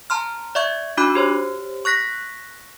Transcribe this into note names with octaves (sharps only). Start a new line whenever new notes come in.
A5 A#5 C6 F6
D5 E5 C#6 G#6
D4 D#4 F#4 B5 D6 F#6
G4 C5 C#5
C#6 F#6 A#6 B6